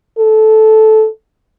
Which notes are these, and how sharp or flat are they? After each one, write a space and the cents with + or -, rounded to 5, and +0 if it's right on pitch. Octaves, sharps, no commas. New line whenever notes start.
A4 -10